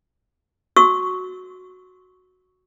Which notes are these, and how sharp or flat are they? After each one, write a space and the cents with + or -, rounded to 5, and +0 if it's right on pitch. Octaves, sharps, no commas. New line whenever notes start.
F#4 -5 C#6 +0 E6 -30